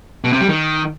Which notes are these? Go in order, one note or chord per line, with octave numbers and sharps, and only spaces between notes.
B2
C3
G3
D#3